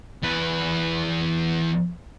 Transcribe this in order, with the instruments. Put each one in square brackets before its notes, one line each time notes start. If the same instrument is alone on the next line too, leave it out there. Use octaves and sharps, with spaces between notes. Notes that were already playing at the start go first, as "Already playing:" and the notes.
[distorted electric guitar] E2 B4